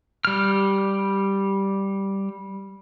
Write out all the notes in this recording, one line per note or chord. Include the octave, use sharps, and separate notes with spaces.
G3 F6